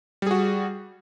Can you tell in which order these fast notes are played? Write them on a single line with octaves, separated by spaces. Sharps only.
G3 G#4 F#4